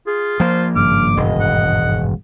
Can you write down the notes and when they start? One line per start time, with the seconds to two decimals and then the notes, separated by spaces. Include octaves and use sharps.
0.07 F4 G#4
0.40 F3 A#3 C5
0.76 G#1 G2 C#3 D6 F6
1.17 E1 D#5
1.41 F#5